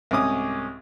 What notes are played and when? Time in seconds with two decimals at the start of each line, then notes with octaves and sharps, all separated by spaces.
0.11 C2 G#2 C#4 D6 D#6